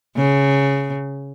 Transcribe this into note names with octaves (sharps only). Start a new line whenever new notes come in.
C#3